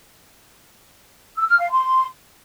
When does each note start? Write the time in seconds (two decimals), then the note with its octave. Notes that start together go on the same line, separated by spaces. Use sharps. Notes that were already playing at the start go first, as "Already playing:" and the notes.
1.35 E6
1.47 F6
1.58 F5
1.70 C6